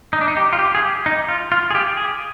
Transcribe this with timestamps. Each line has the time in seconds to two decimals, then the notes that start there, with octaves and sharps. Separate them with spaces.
0.13 D#4
0.21 D4
0.28 D#4
0.37 G4
0.53 F4
0.59 G4
0.75 G#4
0.82 G4
1.06 D#4
1.29 F4
1.52 F4
1.71 G#4
1.75 G4
1.97 G#4